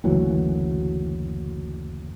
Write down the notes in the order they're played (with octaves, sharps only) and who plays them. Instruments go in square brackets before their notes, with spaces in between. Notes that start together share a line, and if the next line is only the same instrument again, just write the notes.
[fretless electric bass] F#1 D2 E3 F#3